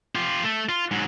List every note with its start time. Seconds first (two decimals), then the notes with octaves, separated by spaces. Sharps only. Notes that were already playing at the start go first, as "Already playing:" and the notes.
0.15 F4 G4
0.43 A3
0.69 F4
0.91 G#2 F#3